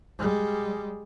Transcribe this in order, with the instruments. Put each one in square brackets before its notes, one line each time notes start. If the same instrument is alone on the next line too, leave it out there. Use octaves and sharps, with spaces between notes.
[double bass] G3 G#3